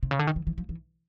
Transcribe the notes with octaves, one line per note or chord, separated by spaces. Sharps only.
C3
C#3
D3
D#3
E3
E3
F3
E3